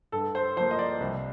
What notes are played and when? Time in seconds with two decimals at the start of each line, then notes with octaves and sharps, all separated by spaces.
0.12 G2 A4
0.35 C5
0.56 F3 A#3 C5
0.71 D#5
0.79 D5
1.00 C2